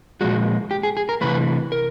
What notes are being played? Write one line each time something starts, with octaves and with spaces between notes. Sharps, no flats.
A#2 F3 G#3 F#4
G4
G#4
G#4
A#4
C3 E3 A3 B4
A#4